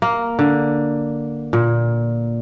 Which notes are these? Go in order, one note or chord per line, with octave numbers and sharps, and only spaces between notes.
A#3
D3
A#2